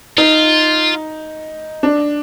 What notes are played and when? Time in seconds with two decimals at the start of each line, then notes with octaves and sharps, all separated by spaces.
0.17 D#4 F4
1.83 D4